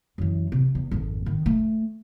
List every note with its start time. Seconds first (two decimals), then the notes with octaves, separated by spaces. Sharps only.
0.18 F#2 E3
0.52 C3
0.75 E2
0.91 G#1 F2
1.26 D#3
1.46 A3